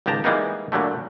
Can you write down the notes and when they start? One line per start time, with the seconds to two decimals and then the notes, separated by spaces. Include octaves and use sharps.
0.06 G#1 C#2 G#3 G4 A5 A#5
0.24 E3 G3 G#3 A#3 B3 D#4
0.72 A#2 D3 F#3 G3 A3